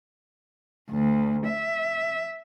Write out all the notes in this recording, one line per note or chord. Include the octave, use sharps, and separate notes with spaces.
D2
E5